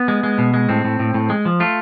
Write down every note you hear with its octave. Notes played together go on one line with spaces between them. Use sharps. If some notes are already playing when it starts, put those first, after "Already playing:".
Already playing: B3
G#3
G#3
B2
G#3
A2 C4
A2
A2
A2
G#3
F3
A3 F4